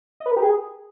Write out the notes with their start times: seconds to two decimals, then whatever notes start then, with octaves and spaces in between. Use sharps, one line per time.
0.20 D#5
0.26 B4
0.31 A#4
0.37 G4
0.42 G#4